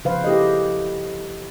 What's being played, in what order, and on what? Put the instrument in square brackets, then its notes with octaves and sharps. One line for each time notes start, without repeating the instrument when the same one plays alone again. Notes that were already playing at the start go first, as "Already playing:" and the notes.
[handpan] C#3 F3 B4 C5 F5
E4 G4 A4 D#5